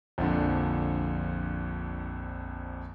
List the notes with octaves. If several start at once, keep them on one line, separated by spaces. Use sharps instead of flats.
A#1 F2 D3